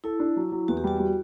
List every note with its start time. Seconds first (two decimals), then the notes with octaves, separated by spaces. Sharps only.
0.04 E4 A4
0.20 D4
0.36 F#3
0.52 F#3
0.68 E2 F#4
0.77 G4
0.84 G3 F#4
0.99 G3